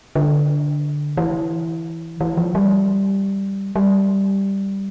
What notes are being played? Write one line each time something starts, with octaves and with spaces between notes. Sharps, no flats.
D3
E3
E3
F3
G3
G3